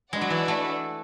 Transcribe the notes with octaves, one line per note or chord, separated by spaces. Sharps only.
G#3 D4 F#4 B4 D5 F#5
F#3
E3
A3